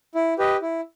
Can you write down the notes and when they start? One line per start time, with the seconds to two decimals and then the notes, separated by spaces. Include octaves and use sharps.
0.15 E4
0.38 G4 B4 D#5
0.62 E4